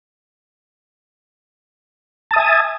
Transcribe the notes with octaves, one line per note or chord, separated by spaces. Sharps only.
E5 G#5 A5 D#6